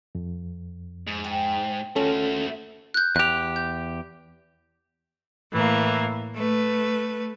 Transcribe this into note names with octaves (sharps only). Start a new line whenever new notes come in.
F2
G#2
G5
D#2 A3 C#4 F4 F#4 A4
F#6 G6
E2 G4 F#6 F7
G6
A2 E3 A#3
A3 B4